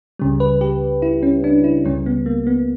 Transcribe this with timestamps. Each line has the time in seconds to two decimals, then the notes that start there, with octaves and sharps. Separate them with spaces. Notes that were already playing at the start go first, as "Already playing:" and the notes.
0.19 C#2 C#3 G3
0.40 B4
0.61 G4
1.02 E4
1.23 C#4
1.44 D4
1.64 E4
1.85 C#2 C#3 G3 C#4
2.06 B3
2.26 A#3
2.47 B3